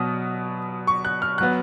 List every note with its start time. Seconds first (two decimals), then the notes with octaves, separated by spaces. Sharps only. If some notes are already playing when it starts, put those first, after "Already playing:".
Already playing: B2 F#3 B3 D#6 F6
0.87 C#6
1.05 F#6
1.22 F6
1.38 F#3 B3 F#6